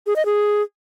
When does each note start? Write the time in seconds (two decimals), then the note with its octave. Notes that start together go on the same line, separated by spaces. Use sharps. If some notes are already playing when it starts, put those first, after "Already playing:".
0.07 G#4
0.16 D#5
0.25 G#4